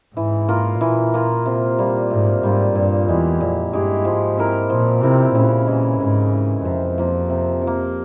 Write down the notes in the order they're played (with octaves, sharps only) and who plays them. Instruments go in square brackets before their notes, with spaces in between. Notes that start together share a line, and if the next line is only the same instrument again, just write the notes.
[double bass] G#2 [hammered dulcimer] E3
[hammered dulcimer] A#3 F4 A#4
[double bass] A#2 [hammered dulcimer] E3
[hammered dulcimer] A#3 F4 A#4
C3
G3 A#3 F4
[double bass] G#2 [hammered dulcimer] C3
[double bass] G#2 [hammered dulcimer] G3 A#3 F4
[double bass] G2 [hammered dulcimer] A#2
[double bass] E2 [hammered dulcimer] G#3 E4 G4
[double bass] F2 [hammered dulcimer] A#2
[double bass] G2 [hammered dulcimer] G#3 E4 G4
[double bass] G#2 [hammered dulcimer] F3
[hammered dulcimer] C4 E4 A#4
[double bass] A#2 [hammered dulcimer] F3
[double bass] C3 [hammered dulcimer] C4 E4 A#4
[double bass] A#2 [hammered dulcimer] C#3
[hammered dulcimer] E3 G#3
[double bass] G#2 [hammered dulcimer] C#3
[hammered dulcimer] E3 G#3
[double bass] F2 [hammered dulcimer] C3
[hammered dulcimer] F3 A#3
C3
F3
A#3